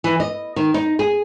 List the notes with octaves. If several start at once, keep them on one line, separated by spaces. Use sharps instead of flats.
E3
D#5
D#3
D#4
G#4